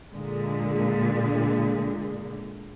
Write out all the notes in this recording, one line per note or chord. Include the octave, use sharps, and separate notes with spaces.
A#2 D3 G#3